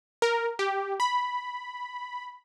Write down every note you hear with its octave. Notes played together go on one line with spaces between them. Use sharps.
A#4
G4
B5